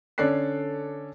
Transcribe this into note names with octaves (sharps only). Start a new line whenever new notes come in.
D3 C#4 A4 D5 F#6 C7